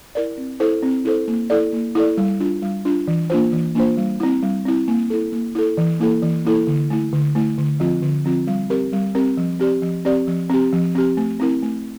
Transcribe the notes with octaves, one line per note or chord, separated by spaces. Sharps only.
E4 A#4 D5
C4
E4 A4 C5
C4
E4 A4 C5
A#3
E4 A4 D5
A#3
E4 A4 D5
G3
D4 F4
G3
D4 F4
E3
A#3 D4 F4 C5
E3
A#3 D4 F4 C5
G3
C4 E4
G3
C4 E4
A#3
E4 A4
A#3
E4 A4
E3
A#3 E4 A4
E3
A#3 E4 A4
D3
A3 E4
D3
A3 E4
D3
F3 C4 F4
D3
F3 C4 F4
G3
C4 G4 A#4
G3
C4 G4 A#4
F3
C4 G4 D5
F3
C4 G4 D5
F3
C4 G4
F3
C4 G4
A3
C4 E4 A#4
A3